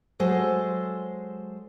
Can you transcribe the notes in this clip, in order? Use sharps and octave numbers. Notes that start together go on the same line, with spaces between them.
F#3 G#3 A4 C5